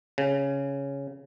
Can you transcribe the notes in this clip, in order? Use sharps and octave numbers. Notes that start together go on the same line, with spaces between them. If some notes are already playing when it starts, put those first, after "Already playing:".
C#3